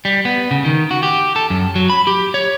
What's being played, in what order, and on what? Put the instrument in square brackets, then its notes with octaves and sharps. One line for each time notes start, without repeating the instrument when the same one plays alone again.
[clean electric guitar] G3
B3
C#3
D#3
F#4
G4
A4
F#2
F#3
B5
G4
C#5